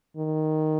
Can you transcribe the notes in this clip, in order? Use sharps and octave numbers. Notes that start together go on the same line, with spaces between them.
D#3